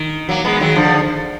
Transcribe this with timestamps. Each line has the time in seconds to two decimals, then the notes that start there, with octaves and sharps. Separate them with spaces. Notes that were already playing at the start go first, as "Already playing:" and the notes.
Already playing: D#3
0.29 F#3 A#3
0.45 G#3 B3
0.60 D#3 F#3
0.75 D3 F3